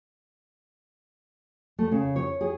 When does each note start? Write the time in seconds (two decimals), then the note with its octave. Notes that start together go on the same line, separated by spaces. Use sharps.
1.79 A3
1.92 C#3
2.16 C#5
2.41 G#4